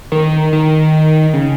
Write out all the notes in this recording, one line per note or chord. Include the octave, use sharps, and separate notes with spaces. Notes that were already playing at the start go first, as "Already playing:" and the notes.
D#3
D#3
C#3